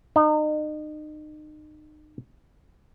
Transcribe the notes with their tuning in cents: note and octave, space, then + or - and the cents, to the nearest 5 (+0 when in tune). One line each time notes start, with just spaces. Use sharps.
D#4 -35